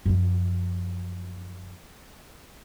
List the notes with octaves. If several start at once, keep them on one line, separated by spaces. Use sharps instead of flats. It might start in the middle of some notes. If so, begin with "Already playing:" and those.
F#2 F3